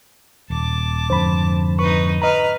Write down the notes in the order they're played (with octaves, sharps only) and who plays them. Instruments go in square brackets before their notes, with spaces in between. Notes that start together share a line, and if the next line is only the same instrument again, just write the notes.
[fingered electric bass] D#1 [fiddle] A5 D6
[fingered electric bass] F2 G#2 D3 [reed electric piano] C5 B5
[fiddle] D#4 B4 [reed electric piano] C#6
[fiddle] B4 F6 [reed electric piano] D#5 A#5